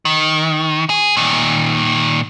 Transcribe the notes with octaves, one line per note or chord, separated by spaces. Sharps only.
D#3
G#4
A#2 D#3